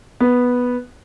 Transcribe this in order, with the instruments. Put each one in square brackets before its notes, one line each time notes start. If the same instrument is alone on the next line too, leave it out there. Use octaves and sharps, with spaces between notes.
[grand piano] B3